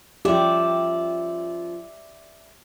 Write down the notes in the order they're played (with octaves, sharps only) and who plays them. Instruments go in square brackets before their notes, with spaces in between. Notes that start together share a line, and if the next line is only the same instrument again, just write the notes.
[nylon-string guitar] F3 C#4 [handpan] G4 [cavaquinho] D5 E5